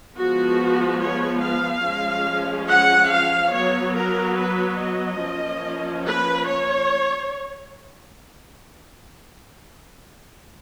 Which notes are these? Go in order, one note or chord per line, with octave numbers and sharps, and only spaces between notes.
F3 G#3 B3 F#4
C#5
F5
F3 G#3 C#4
F#5
F5
F#3 B3 C#5
A#4
B4
D#5
F3 A#3 C#4
B4
C#5